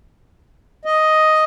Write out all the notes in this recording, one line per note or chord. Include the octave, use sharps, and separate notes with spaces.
D#5